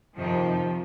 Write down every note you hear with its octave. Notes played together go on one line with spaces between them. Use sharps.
F2 C3 D#3 F3